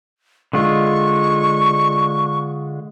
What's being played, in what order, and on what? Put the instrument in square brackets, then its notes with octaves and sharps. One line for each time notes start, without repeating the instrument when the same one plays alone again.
[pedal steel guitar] D3 G#3 F4 [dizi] C#6